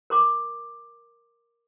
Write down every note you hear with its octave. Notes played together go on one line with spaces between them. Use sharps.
A#4 C6 D6